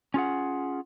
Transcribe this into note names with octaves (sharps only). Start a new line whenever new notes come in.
C#4 F4 G#4 F#5